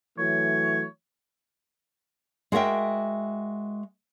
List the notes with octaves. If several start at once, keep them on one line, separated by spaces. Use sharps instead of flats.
E3 F#3 A3 C#5
G#3 F#4 A#4 D#5 E5 G5